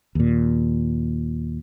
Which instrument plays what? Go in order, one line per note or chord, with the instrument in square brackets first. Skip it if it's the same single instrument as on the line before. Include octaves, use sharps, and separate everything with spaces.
[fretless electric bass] D#2 A#2